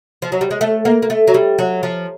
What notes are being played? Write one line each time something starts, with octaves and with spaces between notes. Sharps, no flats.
F3
F#3
G3
G#3
A3
A#3
A#3
A3
F#3
G3
F#3
F3